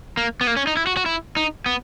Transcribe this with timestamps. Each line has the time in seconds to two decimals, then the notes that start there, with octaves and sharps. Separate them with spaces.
0.17 A#3
0.41 B3
0.47 A#3
0.57 C#4
0.67 D#4
0.77 E4
0.87 F#4
0.97 F#4
1.06 E4
1.37 D#4
1.66 B3